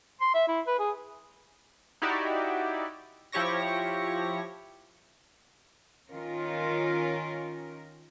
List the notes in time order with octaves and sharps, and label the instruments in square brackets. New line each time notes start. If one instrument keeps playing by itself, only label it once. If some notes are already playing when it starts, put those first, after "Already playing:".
[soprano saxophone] C6
E5
E4
B4
G#4
[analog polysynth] D#4 E4 F#4 G4 D5
F3 E4 G4 C#5 C#6 A#6
[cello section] D#3 C#4 F4 A#4